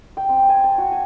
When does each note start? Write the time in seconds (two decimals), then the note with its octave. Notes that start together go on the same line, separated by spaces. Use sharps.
0.17 G5
0.29 C4
0.49 G#5
0.64 A5
0.78 F#4
0.92 G#5